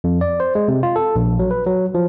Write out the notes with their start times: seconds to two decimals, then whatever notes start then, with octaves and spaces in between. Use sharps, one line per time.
0.04 F2
0.21 D5
0.40 C5
0.55 G#3
0.68 C3
0.83 F4
0.96 A4
1.16 A#1
1.39 F#3
1.51 B4
1.66 F#3
1.95 F3